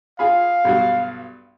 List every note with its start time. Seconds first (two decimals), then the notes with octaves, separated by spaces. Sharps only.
0.19 F4 G#4 F5 B5
0.65 B1 G2 F#4